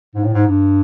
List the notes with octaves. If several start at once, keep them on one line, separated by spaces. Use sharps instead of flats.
G#2
A2
G#2
G2